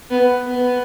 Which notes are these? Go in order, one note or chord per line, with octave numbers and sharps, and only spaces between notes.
B3
B3